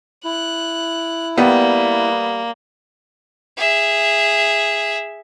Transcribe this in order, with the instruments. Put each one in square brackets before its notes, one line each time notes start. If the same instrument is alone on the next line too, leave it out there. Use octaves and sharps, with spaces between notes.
[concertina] E4 [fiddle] F#6
[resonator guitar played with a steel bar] G3 [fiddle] A#3 [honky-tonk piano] B3
[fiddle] G#4 E5